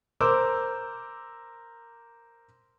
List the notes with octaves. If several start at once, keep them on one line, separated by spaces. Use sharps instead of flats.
A#4 C5 D6 E6